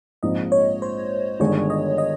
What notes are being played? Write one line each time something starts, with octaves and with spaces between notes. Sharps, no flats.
A#1 G#2 F3 C4 D#4 D#5
C#5
C5
G1 G2 D#3 G#3 C#5
D#5
D#5